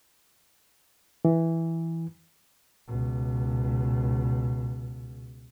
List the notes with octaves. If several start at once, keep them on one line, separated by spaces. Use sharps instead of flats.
E3
C#2 B2